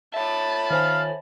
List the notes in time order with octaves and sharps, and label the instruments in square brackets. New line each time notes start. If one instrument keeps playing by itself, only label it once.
[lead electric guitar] C#5 E5 [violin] A5 B5
[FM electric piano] D#3 C5 G#5 [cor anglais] F5